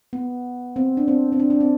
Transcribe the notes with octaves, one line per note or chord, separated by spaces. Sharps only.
B3
C4
D4
C4
C4
D4
D4
C4